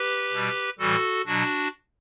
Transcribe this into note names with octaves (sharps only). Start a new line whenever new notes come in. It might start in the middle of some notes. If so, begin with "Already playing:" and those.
Already playing: G4 B4
B2 G3
A2 E3 G3 F#4 A4
B2 F#3 D4 F#4